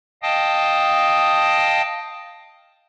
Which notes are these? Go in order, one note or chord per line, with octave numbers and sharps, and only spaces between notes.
D#5 F5 G5 A5 D#6